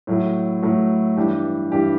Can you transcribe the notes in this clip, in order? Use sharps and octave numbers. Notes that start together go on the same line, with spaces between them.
A2 F#3 A3 E4
A2 F#3 A3 E4
G2 E3 G3 D4 G4
G2 E3 G3 D4 G4